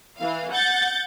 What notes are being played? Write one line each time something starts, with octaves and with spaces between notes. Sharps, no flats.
E3 F5
F#5 G6 A6